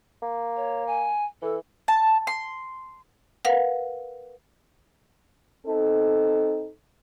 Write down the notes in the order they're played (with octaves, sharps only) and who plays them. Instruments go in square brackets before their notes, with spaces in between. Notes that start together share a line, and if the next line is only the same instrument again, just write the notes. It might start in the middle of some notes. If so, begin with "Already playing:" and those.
[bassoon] A#3
[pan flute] C#5
G#5
[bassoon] E3 [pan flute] A4
[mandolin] A5
C6
[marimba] A#4 B4 F5 F#5
[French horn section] C4 D#4 A4